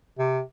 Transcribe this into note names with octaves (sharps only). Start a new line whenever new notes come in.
C3